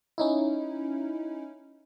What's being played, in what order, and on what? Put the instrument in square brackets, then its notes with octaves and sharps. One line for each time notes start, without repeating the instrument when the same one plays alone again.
[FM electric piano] C#4 D#4 E4